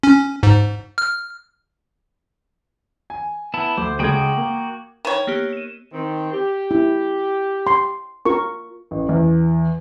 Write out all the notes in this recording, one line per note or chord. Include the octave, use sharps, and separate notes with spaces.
C#4
G#2
F6
G#5
B3 E4 A5
D2 C5 D6
C#2 G#3 F#4 G5 D#6 G#6
A#3
D#3 A#4 C#5
A#3 B3 G4
D#7 E7
D#3 C4
G4
E4
C6
F4 A#4 C#6
A1
E2